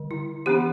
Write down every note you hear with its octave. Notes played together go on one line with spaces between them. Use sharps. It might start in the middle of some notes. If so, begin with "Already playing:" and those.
Already playing: D3 G3
E4
E3 B3 D4 G4